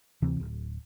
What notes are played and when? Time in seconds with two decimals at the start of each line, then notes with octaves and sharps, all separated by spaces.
0.22 D2 C3 E3 C4
0.40 D1